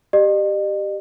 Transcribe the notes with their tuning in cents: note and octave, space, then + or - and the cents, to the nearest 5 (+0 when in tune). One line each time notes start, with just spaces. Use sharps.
G4 +0 D#5 -45